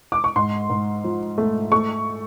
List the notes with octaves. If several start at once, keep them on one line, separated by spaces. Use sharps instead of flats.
D6
C#6
G#2 C6
G#2
F3
A3
A3 C#6